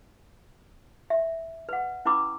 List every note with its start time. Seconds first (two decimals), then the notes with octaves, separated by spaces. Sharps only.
1.10 E5
1.69 B4 F#5
2.05 C#4 E4 B4 B5 D6 E6